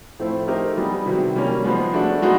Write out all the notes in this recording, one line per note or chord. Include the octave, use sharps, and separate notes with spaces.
A2 F3 A3 C4 E4
A3 C4 D#4 G4 A#4
G3 B3 D#4 G#4
C3 D#3 F#3
G3 A#3 C#4
F3 G#3 B3
A3 D4 F#4
G#3 B3 D#4 F#4